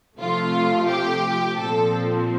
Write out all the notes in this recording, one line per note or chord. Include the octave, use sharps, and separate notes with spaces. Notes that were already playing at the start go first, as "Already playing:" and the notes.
C3 F3 A3 F4
G4
A#2 F3 C4 A4